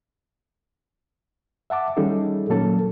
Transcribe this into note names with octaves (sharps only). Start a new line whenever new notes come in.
E5 F#5 A5 D6
D#3 G3 C#4 D#4 G#4 A4
A#2 F#3 A#3 C#4 A4 A5